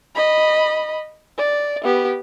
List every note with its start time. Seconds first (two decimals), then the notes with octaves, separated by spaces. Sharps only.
0.16 D#5 B5
1.38 D5
1.84 B3 G4